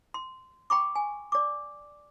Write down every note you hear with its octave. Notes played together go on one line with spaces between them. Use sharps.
C6
G5 B5 C#6 D6
G#5
D5 D6